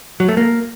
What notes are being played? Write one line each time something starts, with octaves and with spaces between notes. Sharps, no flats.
F#3
A3
A#3